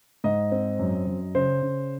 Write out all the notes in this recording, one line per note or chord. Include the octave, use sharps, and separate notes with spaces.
G#2 D#5
C4
F#2
F#2
C#3 C5
C#3